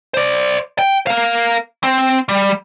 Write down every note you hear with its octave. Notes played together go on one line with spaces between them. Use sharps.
C5 D5
G5
A#4 F5
C4
G3